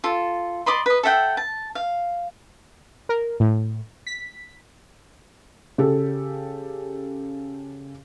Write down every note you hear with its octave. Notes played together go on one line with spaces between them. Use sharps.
F4 A4
D5 D#5 B5 C6
B4 D#5
A4 E5 F#5 G5
A5
F5
A#4
A2
B6
C#3 G4 A4